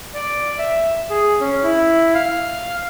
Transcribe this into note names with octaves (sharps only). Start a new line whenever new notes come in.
D5
E5
G#4
C#4
E4
F5